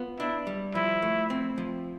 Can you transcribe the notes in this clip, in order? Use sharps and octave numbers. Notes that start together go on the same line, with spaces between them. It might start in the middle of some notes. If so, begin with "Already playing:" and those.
Already playing: B3 F4
D4 E4
G3
F3 E4
A3
C4
F3